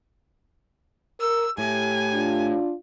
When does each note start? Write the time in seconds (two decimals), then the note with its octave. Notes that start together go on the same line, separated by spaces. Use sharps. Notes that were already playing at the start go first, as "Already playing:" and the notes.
1.20 A#4 E6
1.58 A2 G4 G#5
2.12 D4 F4